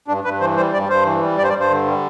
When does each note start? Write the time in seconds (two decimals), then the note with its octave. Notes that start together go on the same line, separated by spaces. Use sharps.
0.08 G2 D4
0.24 G2 B4
0.40 E3 C5
0.57 G3 C5
0.73 G2 D5
0.89 G2 C5
1.05 E3
1.21 G3
1.38 G2 D5
1.44 C5
1.49 D5
1.54 G2
1.60 C5
1.70 D3
1.86 G3